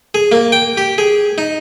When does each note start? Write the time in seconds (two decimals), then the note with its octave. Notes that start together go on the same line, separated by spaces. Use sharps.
0.15 G#4
0.32 A#3
0.52 G5
0.77 G4
0.98 G#4
1.38 D#4